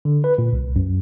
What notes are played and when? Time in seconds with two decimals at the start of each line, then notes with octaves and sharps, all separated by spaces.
0.05 D3
0.24 B4
0.38 A#2
0.53 C2
0.76 F#2